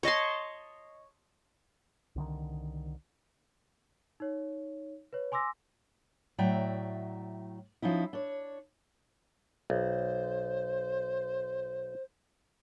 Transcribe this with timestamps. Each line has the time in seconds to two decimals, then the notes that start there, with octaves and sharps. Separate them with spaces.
0.03 C#5 D#5 A5 C6
2.16 C2 D3 D#3
4.20 D#4 C#5
5.13 B4 C#5
5.32 G#5 C6 D6 E6 A#6
6.38 A2 F#3 D5 E5 G5 A#5
7.82 F3 C#4 D#4 E4
8.13 D4 C#5
9.70 B1 C5